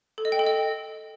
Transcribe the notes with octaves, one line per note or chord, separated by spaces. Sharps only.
A4
D#5
G5
A4
D#5